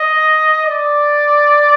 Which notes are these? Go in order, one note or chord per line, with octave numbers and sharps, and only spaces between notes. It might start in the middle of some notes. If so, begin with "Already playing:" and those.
Already playing: D#5
D5